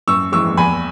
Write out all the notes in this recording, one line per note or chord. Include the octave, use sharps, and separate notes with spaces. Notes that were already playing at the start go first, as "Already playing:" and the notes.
F#2 C#6 E6
E3 G#3 C#6 E6
E2 G#5 B5